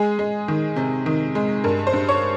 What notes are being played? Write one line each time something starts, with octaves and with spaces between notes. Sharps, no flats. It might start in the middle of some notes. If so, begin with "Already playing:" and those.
Already playing: G#3 G#4
G#3
D#3
C3
D#3
G#3
G2 A#4
C5
G2
C#5